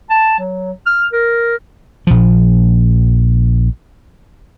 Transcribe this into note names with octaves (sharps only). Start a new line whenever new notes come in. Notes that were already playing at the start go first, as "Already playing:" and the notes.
A5
F#3
F6
A#4
A#1 F3